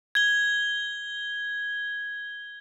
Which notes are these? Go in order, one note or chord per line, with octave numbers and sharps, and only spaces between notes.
G#6 G7